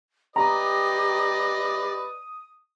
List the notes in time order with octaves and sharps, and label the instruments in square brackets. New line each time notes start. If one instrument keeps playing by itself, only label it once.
[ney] G4 [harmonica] B4 D5 D#5 [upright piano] A#5 [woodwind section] D#6